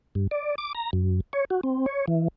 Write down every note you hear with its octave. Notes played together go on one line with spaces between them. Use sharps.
G2
D5
D6
A#5
F#2
C#5
F#4
C4
C#5
E3